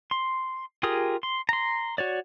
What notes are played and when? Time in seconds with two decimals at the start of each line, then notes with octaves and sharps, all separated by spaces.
0.11 C6
0.83 F4 G4 G#4 A#4 D#6
1.23 C6
1.49 A#5 C6
1.98 F#4 C#5 D5